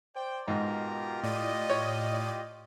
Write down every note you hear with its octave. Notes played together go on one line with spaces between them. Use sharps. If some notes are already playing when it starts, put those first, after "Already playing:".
C5 D5 G5
G#2 B2 F4 G4 A#4 A#5
A2 D5 D#5 D#7
C#5